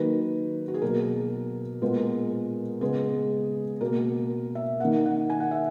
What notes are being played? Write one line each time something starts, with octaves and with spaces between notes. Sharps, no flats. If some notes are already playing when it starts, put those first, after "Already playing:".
Already playing: D#3 F#3 A#3 B4
F#4
G#4
B2 F#3 A#3 A#4
A#2 G#3 B3
C#3 G#3 B3 G#4
B2 A#3 A#4
E5
D#3 A#3 F#5
F#5
G#5
F#5
E5